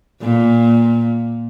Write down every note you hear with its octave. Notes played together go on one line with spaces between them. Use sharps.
A#2